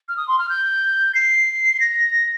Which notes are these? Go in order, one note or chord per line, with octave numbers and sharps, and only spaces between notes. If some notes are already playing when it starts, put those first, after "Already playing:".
F6
D#6
C6
F6
G6
C7
A#6